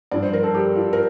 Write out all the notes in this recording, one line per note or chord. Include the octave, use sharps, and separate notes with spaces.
G2 F3 D5
C5
A#4
A4
G4
F4
A#4